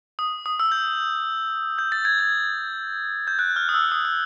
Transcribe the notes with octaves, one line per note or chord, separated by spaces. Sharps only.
D#6
D#6
E6
G6
G6
A6
G#6
G#6
G6
F#6
F6
D#6
E6
D#6
E6